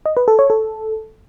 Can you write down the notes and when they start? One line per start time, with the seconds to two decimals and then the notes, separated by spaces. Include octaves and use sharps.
0.06 D#5
0.17 B4
0.28 A4
0.39 C#5
0.50 A4